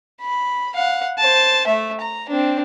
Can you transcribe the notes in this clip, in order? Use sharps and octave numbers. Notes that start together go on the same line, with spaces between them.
B5
F5 F#5
C5 A5
A3 E5
A#5
C4 D4